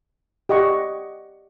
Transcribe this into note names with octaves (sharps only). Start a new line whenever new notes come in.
G4 D#5 F#5 C#6